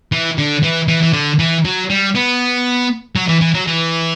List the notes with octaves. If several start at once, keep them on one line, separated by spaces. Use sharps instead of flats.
E3
D3
E3
E3
E3
D3
E3
F#3
G3
B3
F#3
E3
E3
F#3
E3